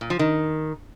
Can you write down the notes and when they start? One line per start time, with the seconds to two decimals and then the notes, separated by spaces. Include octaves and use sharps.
0.01 A#2
0.10 F3
0.19 D#3